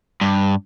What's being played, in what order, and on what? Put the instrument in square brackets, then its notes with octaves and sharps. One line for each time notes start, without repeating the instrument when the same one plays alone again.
[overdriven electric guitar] G2